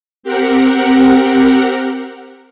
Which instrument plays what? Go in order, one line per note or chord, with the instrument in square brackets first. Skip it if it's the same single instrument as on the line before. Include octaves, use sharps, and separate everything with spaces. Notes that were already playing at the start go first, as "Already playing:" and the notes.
[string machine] C4 G4 A#4 F#5